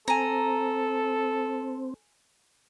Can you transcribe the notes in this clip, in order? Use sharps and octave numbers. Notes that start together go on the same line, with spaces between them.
C4 A4 G#5 A#5